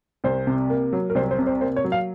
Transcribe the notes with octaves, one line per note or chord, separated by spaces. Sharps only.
C2 C5
C3
A#3
F#3
A#4
C2 C5
C5
C3
C5
A#3 C5
C#5
F#3
F5